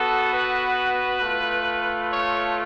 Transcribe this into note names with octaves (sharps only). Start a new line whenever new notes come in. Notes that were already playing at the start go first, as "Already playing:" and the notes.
Already playing: B3 F#4 A4
B4
A3 F4
C#5